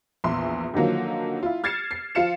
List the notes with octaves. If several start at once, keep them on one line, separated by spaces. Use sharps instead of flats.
A#1 E2 E5 C6
D3 D#3 F3 F#3 A#3
E4 F4
F6 G#6 A6 C7 C#7 E7
C7
F3 F4 F5 C#7 E7